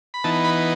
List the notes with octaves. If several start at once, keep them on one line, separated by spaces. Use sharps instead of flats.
B5
E3 B3 D#4 A5
B5